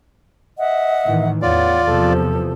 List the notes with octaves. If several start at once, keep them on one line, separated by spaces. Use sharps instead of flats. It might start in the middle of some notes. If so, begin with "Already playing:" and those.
D#5 E5 F#5
A2 D#3 E3
E2 F4 C#5 D5 F#5
E2 C3 F3 A4